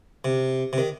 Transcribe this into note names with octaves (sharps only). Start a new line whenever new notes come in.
C3
C3
D#3